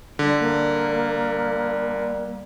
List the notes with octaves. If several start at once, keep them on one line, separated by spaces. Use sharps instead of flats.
D3 G3
A#3